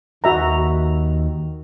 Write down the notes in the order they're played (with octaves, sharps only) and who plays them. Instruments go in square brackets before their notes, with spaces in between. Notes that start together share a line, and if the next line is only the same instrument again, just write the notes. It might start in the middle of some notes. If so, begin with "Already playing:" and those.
[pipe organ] D#2 D#3 [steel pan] F#4 E5 A#5